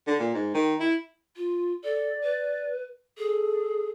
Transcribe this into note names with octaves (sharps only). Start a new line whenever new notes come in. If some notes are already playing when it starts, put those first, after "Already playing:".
D3
A#2
G#2
D#3
E4
F4
A4 D5
B4
G#4 A4